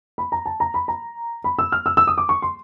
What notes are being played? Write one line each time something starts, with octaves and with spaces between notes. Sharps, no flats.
B5
A#5
A5
A#5
B5
A#5
B5
E6
F6
E6
E6
D#6
D6
C#6
C6